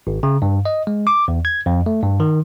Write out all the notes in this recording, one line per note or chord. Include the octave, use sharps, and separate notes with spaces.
G#1
C#3
G2
D#5
G#3
D6
E2
G#6
F2
A3
G2
D#3